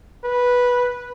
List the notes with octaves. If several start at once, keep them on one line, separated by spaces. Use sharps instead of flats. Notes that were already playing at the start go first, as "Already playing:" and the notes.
B4